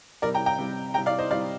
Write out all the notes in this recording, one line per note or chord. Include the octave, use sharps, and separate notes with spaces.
C3 G3 A#4 D5
G5 A#5
G5 A#5
C3 G3
C3 G3 G5 A#5
D5 F5
C5 D#5
C3 G3 D5 F5